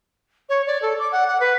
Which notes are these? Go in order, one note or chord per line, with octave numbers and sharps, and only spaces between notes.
C#5
D5
A4
D6
F#5
F#5
B4